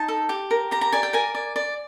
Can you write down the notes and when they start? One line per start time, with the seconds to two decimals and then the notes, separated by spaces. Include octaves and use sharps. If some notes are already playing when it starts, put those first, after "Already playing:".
Already playing: D#4 A5
0.08 A4
0.29 G4
0.51 A#4
0.71 G4 A#5
0.81 A#5
0.92 D5 G#5
1.03 G5
1.13 A#4 G#5
1.35 D5
1.56 D5